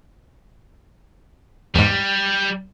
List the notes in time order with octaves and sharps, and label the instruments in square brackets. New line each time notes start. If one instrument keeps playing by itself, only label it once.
[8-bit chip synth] E2 G#2 [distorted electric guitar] G3